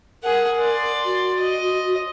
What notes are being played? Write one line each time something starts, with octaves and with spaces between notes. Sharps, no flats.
G#4 A#4 F#5
D5 C6
F#4
D#5